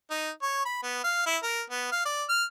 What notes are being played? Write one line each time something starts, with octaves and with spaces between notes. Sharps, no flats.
D#4
C#5
B5
B3
F5
E4
A#4
B3
F5
D5
F6